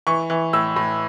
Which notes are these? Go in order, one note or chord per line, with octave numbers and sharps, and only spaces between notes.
E3 C#6
E3
A2 E6
A2